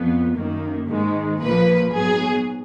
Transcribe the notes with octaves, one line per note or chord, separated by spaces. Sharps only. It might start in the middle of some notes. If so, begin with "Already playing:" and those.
Already playing: F2 B3
F#2 D#3 A#3
G#2 D#3 G#3
A#1 A#2 F3 A#3 B4
G#2 F#3 B3 G#4